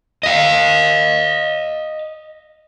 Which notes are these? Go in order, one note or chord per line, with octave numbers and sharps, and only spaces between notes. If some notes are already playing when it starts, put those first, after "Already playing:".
D#5 F5